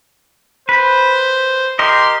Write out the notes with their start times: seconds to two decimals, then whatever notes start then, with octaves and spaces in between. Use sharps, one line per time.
0.69 B4 C5
1.79 G4 A#4 D#5 C6